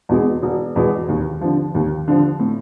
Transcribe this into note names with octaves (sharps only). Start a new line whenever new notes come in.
E2 B2 G#3
E1
E2 B2 G#3
D#2
D3 F3
D#2
D3 F3
A2